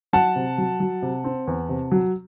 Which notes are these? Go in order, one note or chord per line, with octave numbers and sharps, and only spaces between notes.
F#3 F#5 A5
C3
F#3
F#3
C3
C4
E2
C3
F#3